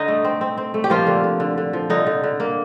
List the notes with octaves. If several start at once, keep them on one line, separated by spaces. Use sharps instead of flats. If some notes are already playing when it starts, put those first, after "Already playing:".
Already playing: D3 D#4 D#5
A3
C4
C4
C4
A3
G4
F3 A#3 F4
D3
D3
D3
D3
F3
D3 D#4
D3
D3
A#3